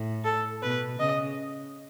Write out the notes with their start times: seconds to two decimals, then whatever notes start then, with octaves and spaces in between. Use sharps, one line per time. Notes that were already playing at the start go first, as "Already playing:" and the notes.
Already playing: A2
0.25 A4
0.62 B2 B4
1.00 C#3 D#5